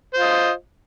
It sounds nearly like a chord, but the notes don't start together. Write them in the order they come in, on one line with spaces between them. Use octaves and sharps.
C5 F4 D#5